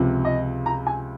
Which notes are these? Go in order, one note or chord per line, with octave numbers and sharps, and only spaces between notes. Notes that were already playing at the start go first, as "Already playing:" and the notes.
Already playing: C#2 C3 F3
D#5
A#5
G#5